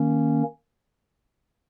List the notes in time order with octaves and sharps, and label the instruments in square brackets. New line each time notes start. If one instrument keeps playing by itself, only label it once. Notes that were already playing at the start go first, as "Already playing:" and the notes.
Already playing: [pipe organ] D#3 A#3 C#4